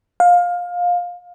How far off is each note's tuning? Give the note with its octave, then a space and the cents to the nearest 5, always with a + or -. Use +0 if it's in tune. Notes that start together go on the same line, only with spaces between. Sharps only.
F5 +20